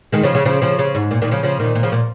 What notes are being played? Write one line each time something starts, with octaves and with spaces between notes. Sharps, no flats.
D#3 G#3
C#3 F3
C#3
C#3 F3
C#3 F3
C#3
G#2
A#2
A#2 D#3
C#3 F3
C#3 F3
A#2 D#3
A#2
C#3 F3
A#2